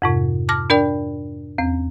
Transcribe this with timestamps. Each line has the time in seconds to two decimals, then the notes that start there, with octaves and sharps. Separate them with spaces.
0.02 F2 G#2 C3
0.49 A5 D6 F6 A#6
0.70 D4 A#4 D5 G5
1.58 E2 C4